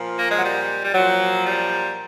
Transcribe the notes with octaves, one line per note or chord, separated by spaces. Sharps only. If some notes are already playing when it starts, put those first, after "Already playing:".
Already playing: A#2 F3
A#3
G#3
F#3
G3
G3
A#2 F3 F#3
G3